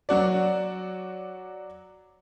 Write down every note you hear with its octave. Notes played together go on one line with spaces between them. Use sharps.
F#3 F#4 D5